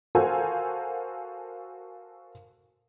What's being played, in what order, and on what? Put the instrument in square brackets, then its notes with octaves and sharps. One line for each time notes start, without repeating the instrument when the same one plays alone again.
[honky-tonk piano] F#4 A4 A#4 C5 F5 G#5